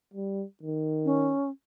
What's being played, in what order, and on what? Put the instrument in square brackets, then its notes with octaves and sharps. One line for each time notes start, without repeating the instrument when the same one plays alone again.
[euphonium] G3
D#3
[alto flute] C#4